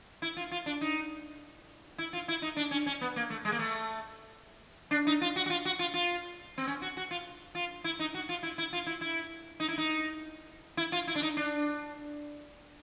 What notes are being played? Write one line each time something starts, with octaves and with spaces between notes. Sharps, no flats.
E4
F4
F4
D4
D#4
E4
F4
E4
D#4
D4
C#4
C#4
B3
A#3
A3
G#3
A#3
A3
D4
D#4
F4
F#4
F#4
F4
F#4
F4
F4
C4
C#4
F#4
F#4
F4
F4
E4
D#4
F#4
F4
E4
E4
F4
E4
E4
D#4
E4
D#4
E4
F4
E4
D4
D#4
D4